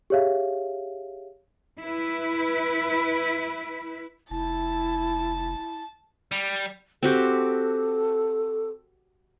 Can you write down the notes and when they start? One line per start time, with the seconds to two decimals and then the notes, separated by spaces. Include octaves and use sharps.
0.10 G4 G#4 C#5 E5 F5
1.80 E4 B4
4.30 F1 E4 A5
6.31 G3
7.03 C4 F#4 G4 A4